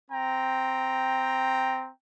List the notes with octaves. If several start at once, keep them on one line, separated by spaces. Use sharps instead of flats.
C4 G5 A#5